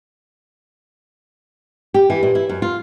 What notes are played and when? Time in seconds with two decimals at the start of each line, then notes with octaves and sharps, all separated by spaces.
1.94 G4
2.10 E3
2.23 A#2
2.35 E4
2.49 F#2
2.62 F4